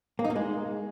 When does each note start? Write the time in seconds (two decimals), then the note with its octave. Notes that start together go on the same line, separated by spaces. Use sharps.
0.19 A#3
0.25 D#4
0.30 A#3
0.36 G#3